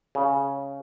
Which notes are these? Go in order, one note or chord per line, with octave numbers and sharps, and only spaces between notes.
C#3